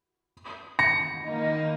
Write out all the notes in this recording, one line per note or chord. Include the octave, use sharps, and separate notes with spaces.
A#6 C#7
D#3 A#3 D#4